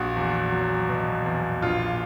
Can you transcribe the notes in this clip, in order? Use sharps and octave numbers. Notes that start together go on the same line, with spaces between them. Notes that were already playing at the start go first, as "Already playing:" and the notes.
Already playing: A#1 F#4
E2
F#3
B2
E2
A#1 F4